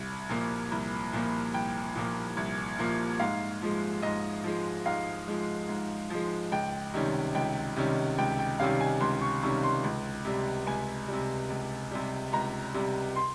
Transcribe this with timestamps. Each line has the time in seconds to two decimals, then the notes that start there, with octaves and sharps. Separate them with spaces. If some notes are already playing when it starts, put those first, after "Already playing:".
Already playing: C2
0.29 A#2 F3 A#3
0.71 C2
1.13 A#2 F3 A#3
1.54 C2 G5
1.95 A#2 F3 A#3
2.37 C2
2.78 A#2 F3 A#3
3.20 G#2 F5
3.62 F3 G#3
4.02 G#2 D#5
4.44 F3 G#3
4.86 G#2 F5
5.28 F3 G#3
5.69 G#2
6.10 F3 G#3
6.52 C#2 G5
6.94 C3 D#3 G3 C#4
7.35 C#2 G5
7.76 C3 D#3 G3 C#4
8.18 C#2 G5
8.39 G5
8.59 C3 D#3 G3 C#4 F5
8.81 G#5
9.00 C#2 C6
9.21 C#6
9.42 C3 D#3 G3 C#4 C#6
9.63 C6
9.84 C#2
10.25 C3 G3
10.66 C#2 G#5
11.08 C3 G3
11.50 C#2
11.91 C3 G3
12.33 C#2 A#5
12.74 C3 G3
13.16 C6